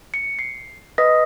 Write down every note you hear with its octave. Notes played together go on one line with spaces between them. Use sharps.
C#7
C7
B4 D#5 D#6 A#6 B6